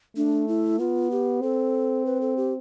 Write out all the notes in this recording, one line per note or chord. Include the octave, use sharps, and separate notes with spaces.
A3 D4
E4
B3 F4
G4
C4 A4
B4
A4
G4